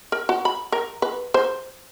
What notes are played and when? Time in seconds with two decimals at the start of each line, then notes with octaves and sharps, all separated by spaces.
0.12 A#4
0.29 F#4
0.45 B5
0.72 A#4
1.02 B4
1.34 C5